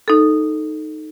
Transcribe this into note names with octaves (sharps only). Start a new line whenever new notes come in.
D#4 A4